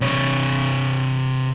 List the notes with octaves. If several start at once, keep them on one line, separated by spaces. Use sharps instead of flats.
C3 C#5